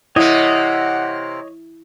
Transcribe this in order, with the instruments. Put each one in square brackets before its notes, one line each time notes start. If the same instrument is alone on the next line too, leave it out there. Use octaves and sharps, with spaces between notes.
[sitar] C3 A#3 [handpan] E4 [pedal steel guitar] C#5 D#5 D#6 [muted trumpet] F#5